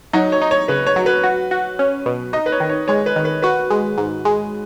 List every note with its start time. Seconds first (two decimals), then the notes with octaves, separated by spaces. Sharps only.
0.13 F#3 D#4
0.32 C#5
0.42 D#4
0.51 C#5
0.68 C#3 B4
0.87 C#5
0.96 F#3
1.06 B4
1.24 F#4
1.51 F#4
1.79 C#4
2.06 B2
2.33 D#4 D#5
2.46 B4
2.52 C#5
2.60 D#3
2.69 C#5
2.88 G#3 C#5
3.06 B4
3.16 D#3
3.25 B4
3.42 F#4 B4
3.70 G#3
3.98 G#2
4.25 G#3